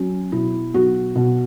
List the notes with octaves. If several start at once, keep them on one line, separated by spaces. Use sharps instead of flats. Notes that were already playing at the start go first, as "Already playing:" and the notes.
Already playing: F#3 C#4
B2 E4
B1 F#4
B2